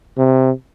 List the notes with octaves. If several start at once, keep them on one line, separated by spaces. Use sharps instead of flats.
C3